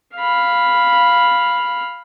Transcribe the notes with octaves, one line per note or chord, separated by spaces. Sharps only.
F5 B5